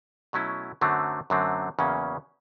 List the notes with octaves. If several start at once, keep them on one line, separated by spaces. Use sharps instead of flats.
B2 F#3 A3 C#4 E4
F#2 D3 F#3 A3 C4
F#2 D3 F#3 A3 C4
E2 C#3 F#3 A#3 C#4